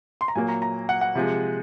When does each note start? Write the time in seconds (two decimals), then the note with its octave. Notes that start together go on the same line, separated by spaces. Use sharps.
0.21 C6
0.28 A#5
0.35 A#2 F#3 A#3 G#5
0.48 A#5
0.62 A#5
0.89 F#5
1.01 F#5
1.15 C3 F3 G#3